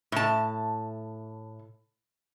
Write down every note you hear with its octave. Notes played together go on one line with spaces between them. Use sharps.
A2 A5